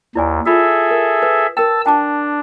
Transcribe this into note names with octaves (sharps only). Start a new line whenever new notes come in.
D#2 E4 D5 G#5
F4 G#4 A4 E5 B5
A#4
B4
A#4 G5 A5 E6
D4 G5 A5 D6